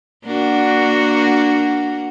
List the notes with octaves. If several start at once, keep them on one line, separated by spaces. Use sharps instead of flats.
A#3 D4 F#4